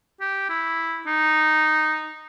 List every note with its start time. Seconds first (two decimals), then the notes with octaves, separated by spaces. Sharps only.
0.20 G4
0.49 E4
1.06 D#4